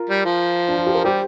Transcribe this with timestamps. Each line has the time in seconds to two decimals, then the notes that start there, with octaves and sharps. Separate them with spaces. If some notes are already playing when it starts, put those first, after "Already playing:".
Already playing: F4 A#4
0.09 G3
0.25 F3
0.68 D4
0.77 F4
0.87 G4
0.95 A#4
1.04 G3 G4 C5